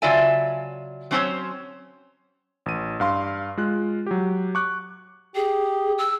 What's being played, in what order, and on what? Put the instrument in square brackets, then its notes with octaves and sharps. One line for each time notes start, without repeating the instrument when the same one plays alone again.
[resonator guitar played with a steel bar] C#3 F#3 F4 D5 E5 G#5
F#3 C4 C#4 A4 C5 C#5
[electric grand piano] A1 D#7
G2 F5 C6
G#3 F4 F#6
F#3 G4
C#6 D6 F#6
[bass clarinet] G4 [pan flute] G#4
[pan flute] E6